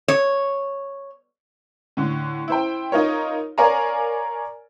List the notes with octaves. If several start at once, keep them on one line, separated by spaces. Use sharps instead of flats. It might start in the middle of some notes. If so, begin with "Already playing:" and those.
C#5
A2 D3
E4 C5 G5
D#4 F4 A#4 C#5
A#4 C#5 D5 F5 G#5 A#5